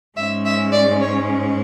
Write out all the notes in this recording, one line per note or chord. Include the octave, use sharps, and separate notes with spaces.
G#2 G#3 C#4 E5
E5
D5
C#5